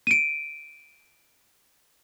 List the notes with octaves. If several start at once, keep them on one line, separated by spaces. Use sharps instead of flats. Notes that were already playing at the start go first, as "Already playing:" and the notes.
D7 D#7